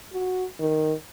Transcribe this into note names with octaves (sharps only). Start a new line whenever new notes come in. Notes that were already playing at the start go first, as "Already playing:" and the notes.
F#4
D#3